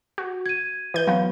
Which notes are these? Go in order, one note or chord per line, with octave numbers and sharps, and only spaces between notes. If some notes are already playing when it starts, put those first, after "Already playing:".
F#4
G#6 D#7
E3 G6
F#3 B3 F5